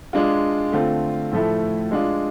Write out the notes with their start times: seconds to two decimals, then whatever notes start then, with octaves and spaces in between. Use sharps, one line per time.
0.13 G#3 D4 F4
0.72 D3 A3 C4 F4
1.32 A2 F3 A3 E4
1.91 G#3 D4 F4